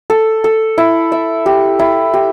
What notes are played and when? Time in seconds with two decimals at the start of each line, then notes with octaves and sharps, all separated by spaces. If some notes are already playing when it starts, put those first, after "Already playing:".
0.10 A4
0.44 A4
0.78 E4
1.12 E5
1.46 G4
1.79 E4
2.14 G4